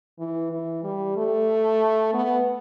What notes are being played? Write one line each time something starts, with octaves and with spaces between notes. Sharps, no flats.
E3
E3
G3
A3
B3